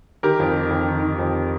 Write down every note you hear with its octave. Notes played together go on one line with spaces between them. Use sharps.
D#3 G4 A#4
F2
D#3
F2
D#3
D#3
F2